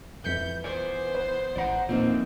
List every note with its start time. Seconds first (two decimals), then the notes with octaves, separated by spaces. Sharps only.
0.24 F2 E3 G6 B6 C#7
0.64 B3 C5 D5 G#5
1.15 B4
1.56 A1 D5 F#5 A#5
1.89 E2 A#2 F3 A#3 C4 D#4